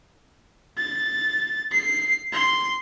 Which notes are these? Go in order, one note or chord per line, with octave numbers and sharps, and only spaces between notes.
A6
C7
C6